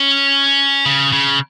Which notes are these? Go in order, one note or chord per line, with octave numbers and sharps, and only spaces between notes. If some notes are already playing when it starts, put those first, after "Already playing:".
Already playing: C#4
C#3
C#3